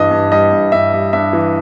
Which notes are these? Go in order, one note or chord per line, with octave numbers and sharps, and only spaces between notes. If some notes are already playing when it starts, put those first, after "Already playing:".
Already playing: G2 E3 G3 D#5
G2
G3 D#5
G2
G2 E5
G3
G2 E5
E3